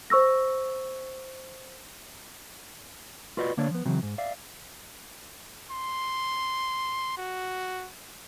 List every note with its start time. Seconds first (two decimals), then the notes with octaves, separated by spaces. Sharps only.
0.10 C5 C#6 E6 A#6
3.37 F4 F#4 B4 D5 D#5
3.57 D3 A#3 D4 C#5 D5
3.71 F3 B3
3.85 C#3 E3 F#3 C4
4.03 G#2
4.18 D5 E5 F5
5.70 C6
7.17 F#4